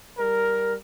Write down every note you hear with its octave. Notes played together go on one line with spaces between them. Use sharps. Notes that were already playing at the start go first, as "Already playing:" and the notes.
G3 A#4